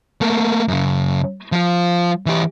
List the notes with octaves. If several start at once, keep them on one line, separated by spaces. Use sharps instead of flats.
A3 A#3
F#2 C#3
F3 F4
E3 G4